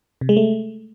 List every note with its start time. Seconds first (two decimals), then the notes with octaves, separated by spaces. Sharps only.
0.21 C3
0.29 G#3
0.37 A3